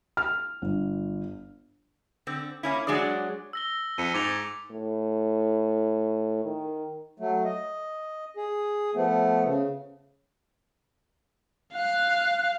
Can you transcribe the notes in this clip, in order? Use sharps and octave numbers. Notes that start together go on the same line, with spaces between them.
F6
G1
D3 C4
A#3 C#4 E4
F#3 G#3 D4 G#4 D5
E6 A#6 G7
F2 C#7 D#7
G#2 D6 F7
A2
D#3
F#3 A3
D#5
G#4
F3 A3 B3
C#3
F5 F#6